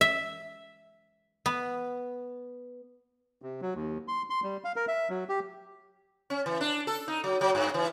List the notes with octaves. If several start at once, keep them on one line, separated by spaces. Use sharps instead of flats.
E5
B3
C3
F#3
D#2
C6
C6
G3
F5
A#4
E5
F#3
G4
C#4
E3
D4
A4
D#4
F#3
F#3
G2
E3